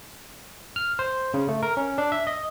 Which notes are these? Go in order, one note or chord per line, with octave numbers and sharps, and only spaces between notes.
F6
C5
C#3
A3
A#4
C#4
D4
E5
D#5